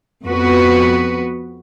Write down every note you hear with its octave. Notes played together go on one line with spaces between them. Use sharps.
F2 B3 F#4 B4